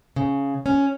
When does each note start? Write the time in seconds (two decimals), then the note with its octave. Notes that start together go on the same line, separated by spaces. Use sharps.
0.16 C#3
0.66 C#4